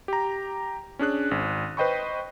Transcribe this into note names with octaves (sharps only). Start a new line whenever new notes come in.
G4 A#5
C#4 D4 G#4 F#6
G#1
B4 C5 D#5 G5 B5 C#6